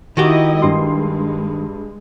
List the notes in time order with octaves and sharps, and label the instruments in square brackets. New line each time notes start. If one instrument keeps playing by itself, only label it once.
[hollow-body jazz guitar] D#3 F#4 G4 [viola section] D#4 E4 D#5
[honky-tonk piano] G2 C6 [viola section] G#3